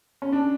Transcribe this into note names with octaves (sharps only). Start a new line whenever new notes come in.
C#4
D4